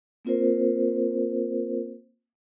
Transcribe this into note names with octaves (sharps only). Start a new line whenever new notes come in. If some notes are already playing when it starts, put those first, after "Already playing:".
A#3 C4 F4 A#4 C5